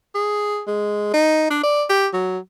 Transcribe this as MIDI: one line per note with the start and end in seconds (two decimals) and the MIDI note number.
0.15 0.62 68
0.67 1.10 56
1.14 1.47 63
1.51 1.59 62
1.64 1.85 74
1.89 2.07 67
2.13 2.38 54